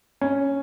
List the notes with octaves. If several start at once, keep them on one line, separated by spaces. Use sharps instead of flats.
C#4